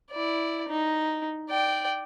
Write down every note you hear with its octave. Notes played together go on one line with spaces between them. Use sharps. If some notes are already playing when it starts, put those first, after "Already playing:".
E4 D5
D#4
D5 G5